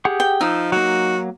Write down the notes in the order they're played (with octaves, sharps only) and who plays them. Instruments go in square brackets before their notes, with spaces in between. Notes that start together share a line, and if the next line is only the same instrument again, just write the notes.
[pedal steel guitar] G4 G#4 F#5
[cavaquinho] G5
[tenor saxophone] F3 [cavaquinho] D#4 [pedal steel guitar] E6
[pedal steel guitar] F#3 A#3 [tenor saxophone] F#4